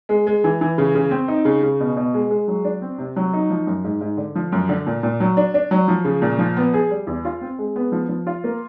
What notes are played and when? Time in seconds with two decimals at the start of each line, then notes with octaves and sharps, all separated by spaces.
0.09 G#3
0.27 G#3
0.44 E3
0.61 E3
0.78 C#3
0.95 C#3
1.11 C4
1.28 D#4
1.45 C#3
1.63 C#3
1.80 B2
1.97 B2
2.14 G#3
2.30 G#3
2.48 F#3
2.64 D4
2.82 C4
2.98 C3
3.16 F#3
3.33 D#4
3.50 F3
3.67 F#2
3.84 G#2
4.01 G#2
4.17 D3
4.35 F3
4.52 F#2
4.69 D3
4.87 A#2
5.03 A#2
5.20 F#3
5.37 D4
5.54 D4
5.71 F#3
5.88 F3
6.04 C#3
6.22 A#2
6.39 F3
6.57 B3
6.74 G#4
6.91 G3
7.07 E2
7.25 F4
7.41 C4
7.58 G#3
7.76 B3
7.92 F3
8.09 F3
8.27 F4
8.44 A#3